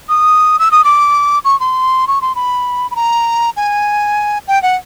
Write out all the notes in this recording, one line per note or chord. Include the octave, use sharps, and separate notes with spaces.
D#6
E6
D#6
D6
C#6
C6
C#6
C6
B5
B5
A#5
G#5
G5
F#5